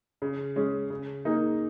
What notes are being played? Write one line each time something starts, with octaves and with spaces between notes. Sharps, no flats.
C#3
G#3 C#4 G#4
C#3
A#3 D#4 G#4